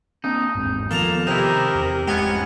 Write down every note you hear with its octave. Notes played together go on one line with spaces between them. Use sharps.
A#3 C4 D4 D#4
G#1 E2 G#2
D#3 F3 A#3 B3 A4 A#5
C3 D#4 E4 G4 A#4
E2
F1 G#2 G#3 B3 C#4 G4 F#5 G#5